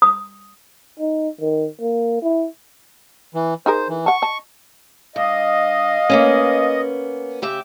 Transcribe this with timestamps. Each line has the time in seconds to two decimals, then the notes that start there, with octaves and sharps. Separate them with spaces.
0.02 D#6
0.99 D#4
1.40 D#3
1.81 A#3
2.22 E4
3.34 E3
3.66 D#4 G#4 A#4 C5
3.89 E3
4.06 F#5 A5 C#6
4.22 D#5 A5
5.16 G2 D#5 F5
6.09 A#3 B3 C#4
7.42 C#3 G4 E5